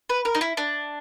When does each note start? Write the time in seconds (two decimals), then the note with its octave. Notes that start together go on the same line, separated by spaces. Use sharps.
0.10 B4
0.25 A#4
0.35 D#4
0.41 E4
0.57 D4